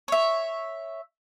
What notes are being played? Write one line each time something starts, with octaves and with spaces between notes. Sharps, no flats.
C#5 E5